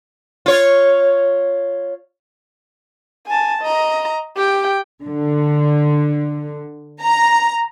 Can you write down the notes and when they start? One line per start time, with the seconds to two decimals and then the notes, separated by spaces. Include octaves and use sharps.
0.46 F4 C#5
3.27 G#5 A5
3.62 D#5 A#5
4.36 G4 G5
5.05 D3
7.03 A#5